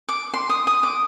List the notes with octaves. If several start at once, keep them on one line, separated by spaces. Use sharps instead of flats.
D6
C6
D#6
D#6
D6